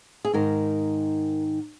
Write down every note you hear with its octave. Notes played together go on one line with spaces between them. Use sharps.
G#4
G#2 D#3 A#4